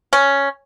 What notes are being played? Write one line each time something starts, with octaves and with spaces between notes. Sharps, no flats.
C#4